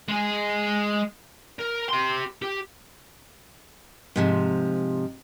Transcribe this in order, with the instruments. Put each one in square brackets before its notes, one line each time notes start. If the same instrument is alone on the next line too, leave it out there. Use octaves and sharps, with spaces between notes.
[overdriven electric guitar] G#3 G#4
A#4
G4 C6
G4
[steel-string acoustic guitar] G#2 C3 F3